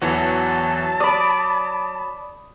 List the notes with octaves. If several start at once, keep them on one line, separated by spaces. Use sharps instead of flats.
E2 E3 F#3 F#4 A5
D5 B5 D#6